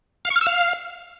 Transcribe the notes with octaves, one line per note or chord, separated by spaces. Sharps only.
F5
C#6
F6
E6
F5